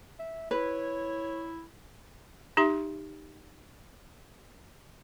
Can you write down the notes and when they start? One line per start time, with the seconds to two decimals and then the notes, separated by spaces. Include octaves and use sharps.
0.19 E5
0.51 E4 B4 C#5
2.57 D#4 G4 E5 C6